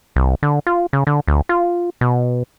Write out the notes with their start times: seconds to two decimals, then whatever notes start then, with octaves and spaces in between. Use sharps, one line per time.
0.16 C2
0.43 D3
0.67 F4
0.93 C#3
1.07 D3
1.28 D2
1.49 F4
2.01 B2